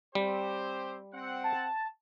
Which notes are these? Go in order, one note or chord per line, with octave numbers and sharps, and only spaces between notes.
G3 C4 G4 C5
C4 F#5
A5